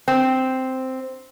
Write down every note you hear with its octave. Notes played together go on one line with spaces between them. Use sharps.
C4